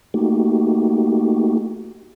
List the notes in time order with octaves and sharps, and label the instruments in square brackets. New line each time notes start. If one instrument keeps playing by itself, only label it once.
[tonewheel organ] A3 A#3 D#4 F#4 G4